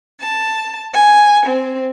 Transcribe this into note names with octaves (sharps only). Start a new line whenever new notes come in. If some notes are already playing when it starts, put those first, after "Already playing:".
A5
G#5
C4